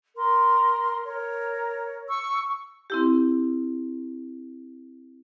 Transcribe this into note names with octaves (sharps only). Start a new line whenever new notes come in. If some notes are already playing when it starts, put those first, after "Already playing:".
A#4 C6
A#4 C#5
C#6 E6
C4 E4 G4